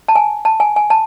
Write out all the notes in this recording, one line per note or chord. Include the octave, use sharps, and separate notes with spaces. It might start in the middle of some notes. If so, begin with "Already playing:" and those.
A5
G#5
A5
G#5
G#5
A5